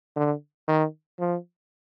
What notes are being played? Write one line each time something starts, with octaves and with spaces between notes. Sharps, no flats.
D3
D#3
F3